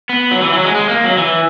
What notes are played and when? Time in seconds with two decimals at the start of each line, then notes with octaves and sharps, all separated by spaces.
0.09 B3
0.31 F#3
0.42 E3
0.53 F#3
0.64 G#3
0.75 G#3
0.89 A#3
1.04 F#3
1.18 E3